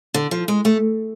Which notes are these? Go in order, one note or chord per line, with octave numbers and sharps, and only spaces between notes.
D3
F3
G#3
A3